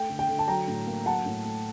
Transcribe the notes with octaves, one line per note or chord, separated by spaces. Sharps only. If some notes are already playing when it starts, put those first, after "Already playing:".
Already playing: A3 G5
D3
G5
D3
A5
F#3 G5 A#5
A2
A#3
F#3 F#5 A5
A2
A3